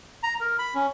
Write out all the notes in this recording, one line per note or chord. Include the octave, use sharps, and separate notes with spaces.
A#5
A#4
B5
C#4